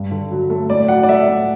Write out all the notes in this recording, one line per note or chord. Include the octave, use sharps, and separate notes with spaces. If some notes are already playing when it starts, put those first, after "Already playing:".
Already playing: G2
D3
F#3
A3
A2 D5
F#3 F#5
D5
A3 E5
A2 F#5